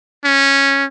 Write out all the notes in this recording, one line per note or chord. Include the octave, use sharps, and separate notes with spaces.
C#4